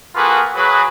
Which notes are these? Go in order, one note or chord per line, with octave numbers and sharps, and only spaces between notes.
A#3 F4 F#4 G#4 A4 B4
F#3 G#4 B4